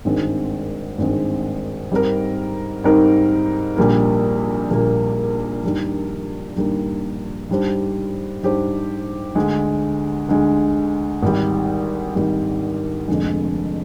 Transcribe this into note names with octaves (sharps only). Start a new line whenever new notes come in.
G#1 G2 D#3 G#3 C4
G#1 G2 D#3 G#3 C4
G#2 G3 C4 D#4 A#4
G#2 G3 C4 D#4 A#4
A#1 A#2 G3 A#3
A#1 A#2 G3 A#3
G2 D#3 G3 A#3
G2 D#3 G3 A#3
G#2 G3 D4 G4 C5
G#2 G3 D4 G4 C5
D2 D3 G#3
D2 D3 G#3
G#1 G#2 G3
G#1 G#2 G3
F1 F2 D3 G#3